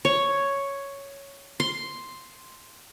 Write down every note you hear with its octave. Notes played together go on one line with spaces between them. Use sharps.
C#5
C6